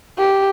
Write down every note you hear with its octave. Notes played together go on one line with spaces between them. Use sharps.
G4